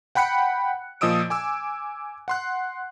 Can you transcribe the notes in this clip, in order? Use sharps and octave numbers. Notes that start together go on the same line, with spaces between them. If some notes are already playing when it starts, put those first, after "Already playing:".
F#5 G5 B5 F#6 C#7
A#2 F3 D#5 D#6 E6 D7
G#5 D6 E6
F#5 C6 F#6